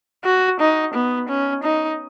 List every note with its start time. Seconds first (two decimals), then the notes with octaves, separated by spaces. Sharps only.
0.25 F#4
0.60 D#4
0.94 B3
1.29 C#4
1.63 D#4